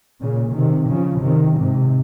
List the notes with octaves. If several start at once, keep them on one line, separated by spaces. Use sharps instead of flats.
A#2 C#3
C3 D#3
C#3 F3
C3 D#3
G#2 C3